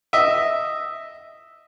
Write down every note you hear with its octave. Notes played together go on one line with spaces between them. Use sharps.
D#5 E5